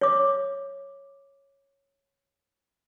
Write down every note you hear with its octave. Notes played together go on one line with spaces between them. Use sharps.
C#5 D6